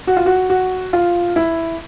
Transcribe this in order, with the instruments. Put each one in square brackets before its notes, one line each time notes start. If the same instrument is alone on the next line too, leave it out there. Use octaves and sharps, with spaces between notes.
[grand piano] F#4
F4
F#4
F#4
F4
E4